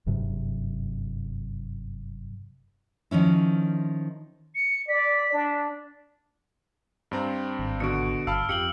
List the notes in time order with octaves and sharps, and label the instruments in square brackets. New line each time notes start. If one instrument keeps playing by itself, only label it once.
[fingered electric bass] F#1 G2 C3 F#3
[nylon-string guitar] D#3 F3 C#4 E4
[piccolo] C#7
[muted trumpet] D5 [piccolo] B6
[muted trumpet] D4
[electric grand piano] G2 C4 A#5
[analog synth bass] G#1
[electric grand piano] B2 D3 F#4 [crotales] C#7 D7
[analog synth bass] G1 [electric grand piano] F5 A5 B5 [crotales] E6 F6
[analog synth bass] F2 [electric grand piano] G4 F5 [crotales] C#7 F#7 G7